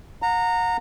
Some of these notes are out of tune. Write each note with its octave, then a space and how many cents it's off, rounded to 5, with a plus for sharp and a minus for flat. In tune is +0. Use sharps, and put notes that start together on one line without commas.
F#5 -35 A#5 -15